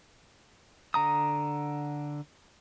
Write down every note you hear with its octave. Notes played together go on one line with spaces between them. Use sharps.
D3 A#5 D#6